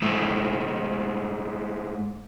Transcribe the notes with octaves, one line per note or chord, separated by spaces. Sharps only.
G#2 A3